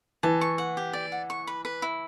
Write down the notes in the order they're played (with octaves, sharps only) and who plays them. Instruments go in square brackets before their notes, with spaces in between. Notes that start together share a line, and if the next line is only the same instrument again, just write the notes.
[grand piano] E3 [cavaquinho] A5
[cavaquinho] C#6
F#5
G4
D5
F#5
C#6
B4
B4
E4